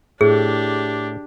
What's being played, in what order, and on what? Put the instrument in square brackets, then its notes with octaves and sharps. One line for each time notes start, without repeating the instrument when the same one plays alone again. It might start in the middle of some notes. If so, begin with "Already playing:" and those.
[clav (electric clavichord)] A2 [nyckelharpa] D4 G4 [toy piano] G#4